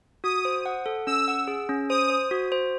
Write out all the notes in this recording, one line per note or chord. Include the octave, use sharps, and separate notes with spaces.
F#4 D#6
C5
F#5
A4
C#4 E6
F#5
G#4
C#4
C5 D#6
C5
F#4
C5